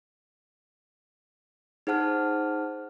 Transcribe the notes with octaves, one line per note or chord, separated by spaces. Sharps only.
D#4 G#4 C5 F#5 A5 F6